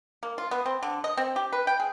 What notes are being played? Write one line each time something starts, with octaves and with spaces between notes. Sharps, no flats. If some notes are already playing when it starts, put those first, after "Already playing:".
A#3
F4
B3
C4
D3
D#5
C4
G4
B4
G5
G#4